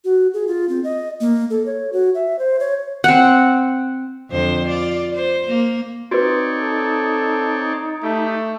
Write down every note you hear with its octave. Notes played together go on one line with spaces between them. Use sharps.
F#4
G#4
F4
C4
D#5
A#3
A4
C#5
F#4
E5
C5
C#5
C4 F#5
F2 D3 C5
F4 D5
C5
A#3
C4 D#4 F#4 B4 C#5 D5
A4
A3 G4